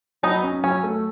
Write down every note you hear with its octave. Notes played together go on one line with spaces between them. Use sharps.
F#3 B3 D#4
C#4
F#3 C#4
A3